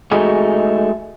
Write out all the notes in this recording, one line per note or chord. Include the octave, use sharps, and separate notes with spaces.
G#3 A3 D#4 F#4 G#4